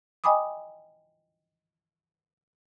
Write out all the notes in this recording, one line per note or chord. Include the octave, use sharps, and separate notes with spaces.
D#5 G5 G#5 B5 D6 D#6